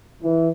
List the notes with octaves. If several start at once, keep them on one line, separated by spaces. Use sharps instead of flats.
E3